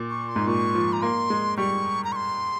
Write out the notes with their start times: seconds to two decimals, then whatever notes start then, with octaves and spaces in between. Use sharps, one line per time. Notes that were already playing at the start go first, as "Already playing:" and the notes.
Already playing: A#2
0.10 C#6
0.28 C6
0.36 G#2
0.47 A#2 C#6
0.75 F3
0.93 A#5
1.02 A#3 C6
1.30 G#3
1.57 G3 C#6
2.04 A#5
2.12 C#6
2.16 C6